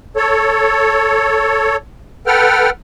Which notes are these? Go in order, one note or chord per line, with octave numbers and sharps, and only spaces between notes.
A4 C#5
A4 B4 F#5 G5 F6